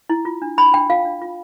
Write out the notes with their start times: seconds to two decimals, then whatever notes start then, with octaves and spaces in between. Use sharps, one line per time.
0.10 E4
0.25 F4
0.42 D4
0.58 D4 B5
0.74 D4 G5
0.90 F4 F5
1.05 D4
1.22 F4